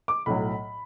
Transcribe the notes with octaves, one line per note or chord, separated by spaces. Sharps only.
D6
B1 A2 F#3 B5